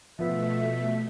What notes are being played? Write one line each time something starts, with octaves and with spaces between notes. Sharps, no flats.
B2 F3 A3 B3 F4 E5